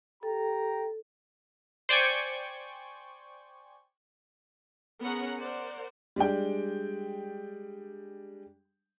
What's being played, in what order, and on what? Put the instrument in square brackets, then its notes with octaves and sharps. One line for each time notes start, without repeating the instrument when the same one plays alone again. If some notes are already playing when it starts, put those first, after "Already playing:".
[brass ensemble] G4 G5 A#5 [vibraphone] A4
[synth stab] C5 D5 G5 G#5 C#6
[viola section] B3 C#4 G#4 A#4 F#5 A#5
A#4 C5 D5 F#5
[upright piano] G3 G#3 D4 G5